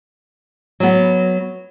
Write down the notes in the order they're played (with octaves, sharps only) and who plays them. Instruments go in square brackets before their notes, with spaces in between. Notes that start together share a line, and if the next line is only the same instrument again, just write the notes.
[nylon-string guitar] F#3 B3